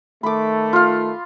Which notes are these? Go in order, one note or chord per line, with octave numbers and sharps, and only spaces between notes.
D#3 A3 B5 D6
F4 F5